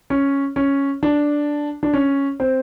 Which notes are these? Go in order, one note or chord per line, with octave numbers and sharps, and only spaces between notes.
C#4
C#4
D4
D4
C#4
C4